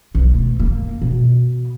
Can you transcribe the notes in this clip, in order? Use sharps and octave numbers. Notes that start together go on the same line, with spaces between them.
B1
A3
A#3
B2